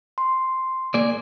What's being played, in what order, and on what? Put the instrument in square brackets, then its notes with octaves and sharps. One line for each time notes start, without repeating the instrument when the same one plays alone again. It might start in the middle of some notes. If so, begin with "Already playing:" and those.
[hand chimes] C6
[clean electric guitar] A#3 G#4 D5